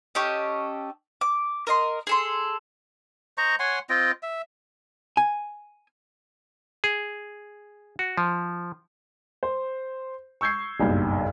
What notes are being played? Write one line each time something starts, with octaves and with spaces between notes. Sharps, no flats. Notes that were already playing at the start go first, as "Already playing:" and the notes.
C#4 G4 A4 D#5
D6
A#4 D#5 C6
G#4 A4 C6
C5 D#5 A#5 C#6
C#5 F#5 G#5 C6
C4 F4 D#5 G5
E5
G#5
G#4
F#4
F3
C5
C#6 E6 G6 G#6 C7
F#1 B1 G2